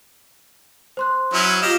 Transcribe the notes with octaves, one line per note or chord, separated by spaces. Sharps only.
C5 C6 F#6
F#3 C#4 E4
F4 G4 D#5 F5 E7